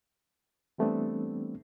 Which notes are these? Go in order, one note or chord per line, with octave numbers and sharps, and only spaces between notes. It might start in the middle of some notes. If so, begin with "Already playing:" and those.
E3 G3 A3 B3 C4 D4